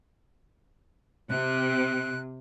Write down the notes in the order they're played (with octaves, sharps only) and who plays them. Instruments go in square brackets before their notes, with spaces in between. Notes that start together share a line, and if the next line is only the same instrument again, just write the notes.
[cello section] C3 [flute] F#6